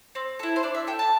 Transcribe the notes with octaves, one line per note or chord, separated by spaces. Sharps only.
C4
E4 A4
C5
D4 D5
E5
A4 G5
A5